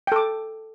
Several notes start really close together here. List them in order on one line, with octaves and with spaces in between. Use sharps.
G5 A4 D6